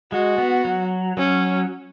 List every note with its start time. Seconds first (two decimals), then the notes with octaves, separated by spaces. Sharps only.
0.12 G#3 F#4
0.38 B3
0.65 F#3
1.17 F#3 C#4